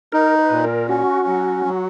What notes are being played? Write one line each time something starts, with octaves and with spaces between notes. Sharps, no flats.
D#4 A#4
B4
A#2
A#4
C#4 F#4
F#3
F#3